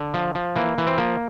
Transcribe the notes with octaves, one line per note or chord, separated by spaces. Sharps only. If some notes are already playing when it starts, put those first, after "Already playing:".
Already playing: D3
F3
F3
E3 A#3
E3
C4
F3 A#3